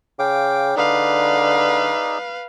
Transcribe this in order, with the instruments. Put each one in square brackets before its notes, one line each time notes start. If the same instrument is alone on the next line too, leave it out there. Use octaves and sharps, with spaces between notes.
[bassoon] C#3 [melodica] F5 G5 D6
[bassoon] D3 [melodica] D#4 G#4 D5 [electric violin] B4 F5